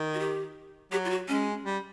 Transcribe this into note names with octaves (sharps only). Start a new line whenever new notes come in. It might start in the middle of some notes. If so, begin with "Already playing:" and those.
Already playing: D#3
F#4
G4
F#3 G4
F4
F#4
G#3 C#4
G3